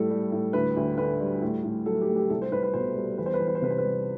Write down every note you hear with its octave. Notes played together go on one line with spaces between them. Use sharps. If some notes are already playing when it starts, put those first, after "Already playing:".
Already playing: A2 G3 A4
G3
A2
D2 B4
D2
D3 B4
G3
A2
A2
F#3 A4
G4
A3
G4
C2 A4
C5
C2 B4
B4
B2 C5
G3
E2 B4
C5
B4
E2 C5
B4
C5
C3 B4
C5
B4
G3